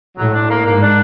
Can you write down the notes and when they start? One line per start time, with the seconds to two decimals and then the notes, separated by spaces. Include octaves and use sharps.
0.16 A2 F#3
0.32 D4
0.48 A#3
0.64 G#2 A#3
0.80 D4